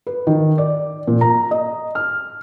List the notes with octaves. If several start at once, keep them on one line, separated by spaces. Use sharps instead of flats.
B4
D#3
D5
A#2
A#5
D#5
F6